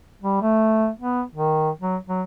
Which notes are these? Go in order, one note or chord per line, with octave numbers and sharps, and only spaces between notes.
G3
A3
B3
D#3
F#3
F#3